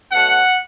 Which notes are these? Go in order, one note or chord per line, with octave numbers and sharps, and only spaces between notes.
B2 F#3 A3 F#5